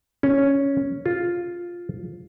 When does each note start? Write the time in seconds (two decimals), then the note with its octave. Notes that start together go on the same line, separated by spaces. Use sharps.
0.23 C#4
1.06 F4